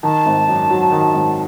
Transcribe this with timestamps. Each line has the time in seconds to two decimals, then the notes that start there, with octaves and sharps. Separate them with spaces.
0.03 D#3 A5
0.26 G#1
0.48 F#2
0.69 F#3
0.92 D#3
1.14 G#1